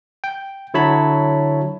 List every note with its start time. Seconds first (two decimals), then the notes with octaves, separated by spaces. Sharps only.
0.24 G5
0.74 D3 F#3 E4 C#5 A5 B5